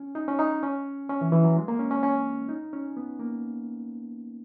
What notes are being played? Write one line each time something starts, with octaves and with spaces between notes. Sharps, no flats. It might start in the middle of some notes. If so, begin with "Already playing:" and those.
Already playing: C#4
D#4
C#4
D#4
C#4
C#4
E3
E3
F#3
G#3
A#3
C#4
C#4
C#4
D#4
C#4
B3
A#3